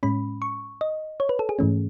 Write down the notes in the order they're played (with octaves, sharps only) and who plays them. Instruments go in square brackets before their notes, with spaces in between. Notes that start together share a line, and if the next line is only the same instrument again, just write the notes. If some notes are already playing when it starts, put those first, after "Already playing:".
[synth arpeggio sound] A2 G#3 C#4 B5
C#6
D#5
C#5
B4
A4
G#4
G#2 E3 A3 C#4